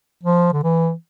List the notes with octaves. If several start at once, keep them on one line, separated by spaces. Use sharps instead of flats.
F3
D3
E3